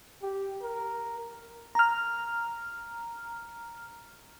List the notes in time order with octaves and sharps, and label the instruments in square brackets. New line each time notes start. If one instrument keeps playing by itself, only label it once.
[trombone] G4
A#4
[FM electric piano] A#5 F6